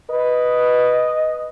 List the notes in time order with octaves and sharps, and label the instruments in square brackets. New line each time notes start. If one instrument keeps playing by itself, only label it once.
[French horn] B4 [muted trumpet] D#5